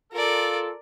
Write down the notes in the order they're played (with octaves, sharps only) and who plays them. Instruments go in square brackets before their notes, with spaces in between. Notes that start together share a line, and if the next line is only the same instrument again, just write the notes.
[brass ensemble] F4 A4 [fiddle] A#4 D5